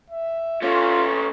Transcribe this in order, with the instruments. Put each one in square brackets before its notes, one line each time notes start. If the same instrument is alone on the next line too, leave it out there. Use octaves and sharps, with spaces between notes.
[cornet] E5
[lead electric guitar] A3 C#4 [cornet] F4